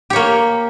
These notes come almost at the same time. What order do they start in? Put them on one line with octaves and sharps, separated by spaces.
G4 C#5 A#3